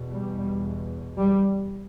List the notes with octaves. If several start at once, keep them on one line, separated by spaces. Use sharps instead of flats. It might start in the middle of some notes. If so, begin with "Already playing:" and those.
Already playing: E2 B2
G3
G3